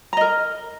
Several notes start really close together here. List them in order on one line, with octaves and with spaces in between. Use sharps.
A#5 D#5 A#4